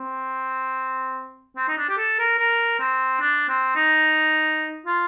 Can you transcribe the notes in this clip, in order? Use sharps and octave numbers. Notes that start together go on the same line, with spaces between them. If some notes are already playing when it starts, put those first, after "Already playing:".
Already playing: C4
C4
D#4
D4
G4
A4
A#4
A#4
C4
D4
C4
D#4
F4